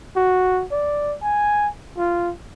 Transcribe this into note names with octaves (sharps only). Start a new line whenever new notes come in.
F#4
D5
G#5
F4